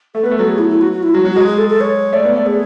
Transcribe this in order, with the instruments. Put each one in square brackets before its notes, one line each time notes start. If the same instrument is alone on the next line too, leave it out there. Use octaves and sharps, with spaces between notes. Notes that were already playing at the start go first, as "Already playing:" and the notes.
[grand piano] A3 [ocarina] A4
[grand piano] B3 [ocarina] B4
[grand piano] A3
[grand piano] F#3 [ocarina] A4
[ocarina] G#4
E4
E4
F#4
F#4
E4
[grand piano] F#3 [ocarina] F#4
[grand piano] F#3
[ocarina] F#4
[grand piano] G#3
[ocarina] G#4
A4
A4
C#5
[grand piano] A3 [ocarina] D5
[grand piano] B3
A3
[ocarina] G#4